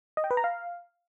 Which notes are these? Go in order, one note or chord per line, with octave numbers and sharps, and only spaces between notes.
D#5
G5
B4
A#5
F5